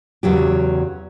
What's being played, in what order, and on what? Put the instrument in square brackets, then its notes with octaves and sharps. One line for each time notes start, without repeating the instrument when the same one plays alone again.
[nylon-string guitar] E2 C#3 F#3 G4